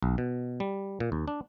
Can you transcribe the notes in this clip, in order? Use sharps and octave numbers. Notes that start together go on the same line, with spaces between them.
B1
B2
G3
A#2
D#2
D4